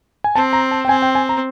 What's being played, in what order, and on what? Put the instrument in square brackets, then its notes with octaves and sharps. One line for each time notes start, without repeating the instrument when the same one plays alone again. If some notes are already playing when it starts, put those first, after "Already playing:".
[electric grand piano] G#5
[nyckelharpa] C4 [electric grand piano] A5
[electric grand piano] A#5
A5
G5
[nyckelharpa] C4 [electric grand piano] G#5
[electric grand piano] G5
G#5
A#5